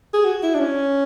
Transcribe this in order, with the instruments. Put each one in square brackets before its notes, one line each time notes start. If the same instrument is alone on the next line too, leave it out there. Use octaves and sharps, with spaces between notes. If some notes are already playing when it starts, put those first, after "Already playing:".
[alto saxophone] G#4
F#4
E4
D4
C#4